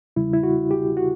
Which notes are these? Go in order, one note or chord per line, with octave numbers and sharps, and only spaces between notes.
E2 C#3 G3 E4
E4
F#4
G4
F#4